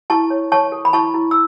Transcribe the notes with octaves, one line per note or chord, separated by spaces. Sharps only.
E4 A5 C#6
C#5
C#5 A5 C#6
A4
B5
E4 A5 C#6
E4
E6